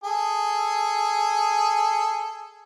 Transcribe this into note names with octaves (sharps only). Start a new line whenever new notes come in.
G#4 A4